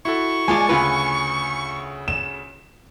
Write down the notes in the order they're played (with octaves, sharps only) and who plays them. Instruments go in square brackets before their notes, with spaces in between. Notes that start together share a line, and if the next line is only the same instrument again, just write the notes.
[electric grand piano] E4 F#4 A4 [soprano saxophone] C#6
[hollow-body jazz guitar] G#3 F4 D5 [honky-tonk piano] G#5 A5
[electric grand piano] D2 C#3 [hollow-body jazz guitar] F4 B4
[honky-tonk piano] E7